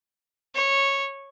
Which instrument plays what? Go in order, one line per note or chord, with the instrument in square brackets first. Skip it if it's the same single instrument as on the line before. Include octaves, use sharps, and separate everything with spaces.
[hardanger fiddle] C#5